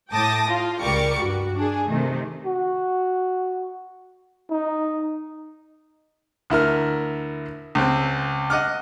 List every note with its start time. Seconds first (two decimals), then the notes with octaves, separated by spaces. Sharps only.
0.13 A2 G5 A5 D6 D#6 A#6
0.50 F4 F5
0.79 C#2 G3 A#4 C#6 D6 C#7
1.17 G2 F#4
1.57 D4 G#4
1.88 C3 D#3 A3
2.45 F#4
4.50 D#4
6.50 D2 E4 A#4 F6
7.75 C#2 C4
8.50 D#5 F#5 D6 F6